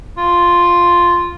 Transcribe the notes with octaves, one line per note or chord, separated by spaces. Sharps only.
F4